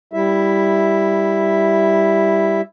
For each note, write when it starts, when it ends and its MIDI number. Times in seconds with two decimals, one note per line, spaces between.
0.13 2.61 55
0.13 2.61 64
0.13 2.61 76